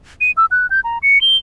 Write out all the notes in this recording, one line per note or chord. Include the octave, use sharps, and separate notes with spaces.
D#7
E6
F#6
G6
A#5
C#7
G7